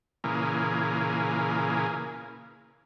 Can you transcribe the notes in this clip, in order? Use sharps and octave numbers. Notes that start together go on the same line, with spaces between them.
A#2 C#3 E3 A#3 G#4